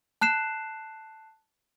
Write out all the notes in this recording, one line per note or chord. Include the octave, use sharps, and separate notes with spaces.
A5 F#6 C7 E7